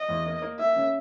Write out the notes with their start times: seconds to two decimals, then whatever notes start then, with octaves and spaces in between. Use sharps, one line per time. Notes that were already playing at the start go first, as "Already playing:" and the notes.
Already playing: D#5
0.09 E2
0.26 A#3
0.42 A#3
0.59 A#3 E5
0.76 C#3